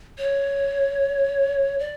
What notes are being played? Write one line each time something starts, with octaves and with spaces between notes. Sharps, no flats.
C#5
D5